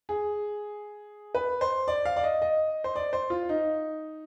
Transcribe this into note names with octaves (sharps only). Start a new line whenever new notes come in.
G#4
B4
C5
D5
F5
D5
D#5
D#5
C5
D5
C5
F4
D#4